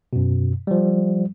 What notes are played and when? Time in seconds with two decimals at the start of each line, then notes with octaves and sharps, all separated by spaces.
0.13 F#2 B2
0.67 F3 G3